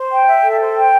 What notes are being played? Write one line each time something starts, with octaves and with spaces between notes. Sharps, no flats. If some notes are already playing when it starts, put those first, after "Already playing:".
Already playing: C5
G5
E5
A4
C5
G5